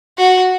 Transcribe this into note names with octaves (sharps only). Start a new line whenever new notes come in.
F#4